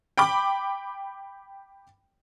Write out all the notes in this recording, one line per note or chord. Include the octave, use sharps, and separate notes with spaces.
G5 B5 D6